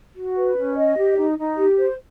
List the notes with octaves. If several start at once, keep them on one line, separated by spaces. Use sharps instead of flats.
F#4
B4
C#4
D#5
G4
D#4
D#4
G4
C5